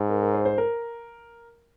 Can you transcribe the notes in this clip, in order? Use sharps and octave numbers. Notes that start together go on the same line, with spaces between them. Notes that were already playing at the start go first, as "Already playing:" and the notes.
Already playing: G#2
A#4
A#4
C5
C5
A#4